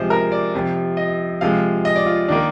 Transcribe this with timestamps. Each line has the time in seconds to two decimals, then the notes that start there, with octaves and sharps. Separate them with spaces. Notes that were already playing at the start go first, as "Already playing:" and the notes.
Already playing: C3 F3 G#3 C5
0.10 A#4
0.32 D5
0.54 F2 C3 F3
0.97 D#5
1.41 C3 F3 G#3 F5
1.85 D#5
1.96 D5
2.06 F4
2.28 D#3 A#3 D4